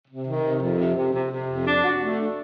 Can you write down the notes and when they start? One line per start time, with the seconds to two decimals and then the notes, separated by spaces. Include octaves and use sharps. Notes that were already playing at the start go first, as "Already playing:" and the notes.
0.08 C3
0.26 D#3
0.43 C3
0.60 F2
0.79 C3
0.95 C3
1.13 C3
1.31 C3
1.48 F2
1.67 D4
1.84 F#4
2.01 A3
2.19 D4